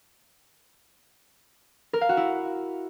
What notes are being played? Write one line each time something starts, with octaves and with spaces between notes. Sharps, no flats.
A#4
F5
F#4
E4